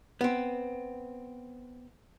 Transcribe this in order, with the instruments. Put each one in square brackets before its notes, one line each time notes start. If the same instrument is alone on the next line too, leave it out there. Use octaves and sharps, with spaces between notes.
[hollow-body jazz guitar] B3 C4